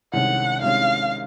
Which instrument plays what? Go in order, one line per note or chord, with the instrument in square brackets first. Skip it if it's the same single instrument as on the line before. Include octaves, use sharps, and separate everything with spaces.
[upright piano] C2 C3 D#3 G#3 C#4 [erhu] F#5
[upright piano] C2 C3 D#3 G#3 C#4 [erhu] F5